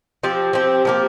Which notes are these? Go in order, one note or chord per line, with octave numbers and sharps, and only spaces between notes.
F3 C4 G4
F3 C4 G4
F3 A#3 G4